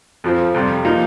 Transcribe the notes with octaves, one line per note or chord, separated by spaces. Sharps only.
F2 F3 C4
F2 C3 G3
F3 A#3 D#4